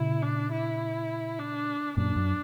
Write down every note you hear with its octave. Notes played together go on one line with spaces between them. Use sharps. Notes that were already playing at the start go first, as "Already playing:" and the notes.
Already playing: A#2 C#3 E4
D4
E4
D4
F#2 A#2 D4
F#2